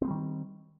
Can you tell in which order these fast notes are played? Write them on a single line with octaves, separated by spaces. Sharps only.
C4 B3 G3 D#3